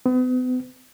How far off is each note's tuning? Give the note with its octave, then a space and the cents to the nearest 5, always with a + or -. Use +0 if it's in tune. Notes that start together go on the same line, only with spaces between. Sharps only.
B3 +40